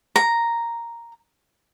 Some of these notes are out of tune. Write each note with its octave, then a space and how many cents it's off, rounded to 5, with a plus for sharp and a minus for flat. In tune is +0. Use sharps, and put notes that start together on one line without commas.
A#5 +0